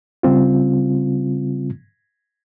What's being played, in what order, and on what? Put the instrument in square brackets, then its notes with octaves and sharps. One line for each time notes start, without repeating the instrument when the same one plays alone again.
[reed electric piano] C#3 G3 C4 F4